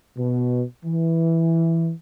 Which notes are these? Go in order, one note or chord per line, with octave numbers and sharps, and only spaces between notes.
B2
E3